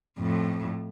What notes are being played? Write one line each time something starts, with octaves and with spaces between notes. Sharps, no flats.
F2 A2